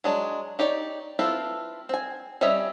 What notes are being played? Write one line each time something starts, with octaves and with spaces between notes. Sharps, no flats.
F#3 G#3 D4
D#4 G4 C#5 D5
C4 E4 F4 A4 B4
C4 G#5
G3 C4 C#4 D#5 E5